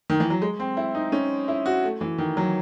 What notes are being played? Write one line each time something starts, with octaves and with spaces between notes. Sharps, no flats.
D#3
E3
F#3
G#3
C4
E4
D#4
C#4
E4
F#4
A3
E3
D#3
F#3